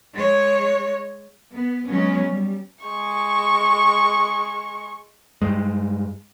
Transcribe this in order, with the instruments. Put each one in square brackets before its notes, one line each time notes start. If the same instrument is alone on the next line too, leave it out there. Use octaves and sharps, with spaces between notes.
[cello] G#3 C#5
[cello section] B3
F#3 G#3 B3 C#4
G3
[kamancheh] G#3 C#6
[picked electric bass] G2 G#3